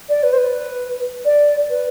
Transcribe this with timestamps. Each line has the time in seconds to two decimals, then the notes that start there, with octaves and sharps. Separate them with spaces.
0.09 D5
0.23 B4
0.33 C5
0.38 B4
1.25 D5
1.70 B4